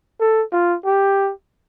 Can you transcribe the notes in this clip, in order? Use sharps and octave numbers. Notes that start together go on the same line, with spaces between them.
A4
F4
G4